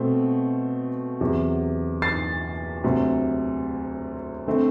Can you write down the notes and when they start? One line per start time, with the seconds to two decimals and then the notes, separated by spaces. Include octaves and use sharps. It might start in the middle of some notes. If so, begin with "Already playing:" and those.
Already playing: B2 A3 C4
1.21 E2 C3 F#3
2.02 A6 C7
2.84 D2 C3 F#3
4.47 D3 A3 C4